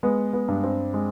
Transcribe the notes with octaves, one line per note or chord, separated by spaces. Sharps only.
G#3 B3
B3
G2
C4
G#3